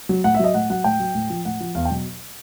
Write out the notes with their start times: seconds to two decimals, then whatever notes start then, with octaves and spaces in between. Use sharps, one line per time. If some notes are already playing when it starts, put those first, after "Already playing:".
0.09 F#3
0.24 A2 F#5
0.35 E5
0.39 F#3 D#5
0.54 A2 F#5
0.70 F#3 F#5
0.84 A2 G5
1.00 F#3
1.15 A2
1.30 F3
1.45 A2 F#5
1.60 F3
1.75 E2 F5
1.85 G5
1.90 B2 F#3